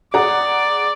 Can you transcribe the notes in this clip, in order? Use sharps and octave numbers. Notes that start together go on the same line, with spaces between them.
G#4 D5 F#5 A#5